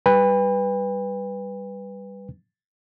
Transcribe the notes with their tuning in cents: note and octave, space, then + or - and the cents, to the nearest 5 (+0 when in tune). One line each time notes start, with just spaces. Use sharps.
G3 +0 B4 +0 G5 +45